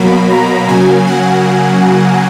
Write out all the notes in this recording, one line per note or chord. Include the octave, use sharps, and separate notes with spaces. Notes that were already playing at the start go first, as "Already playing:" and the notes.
Already playing: B2 F#3 A#3 B5
A#5
C#3 F#3 A#3 G#5
F#5